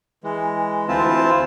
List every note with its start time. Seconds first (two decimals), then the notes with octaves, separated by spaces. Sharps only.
0.24 E3 G#3
0.88 D2 E3 C4 E4 F4 A5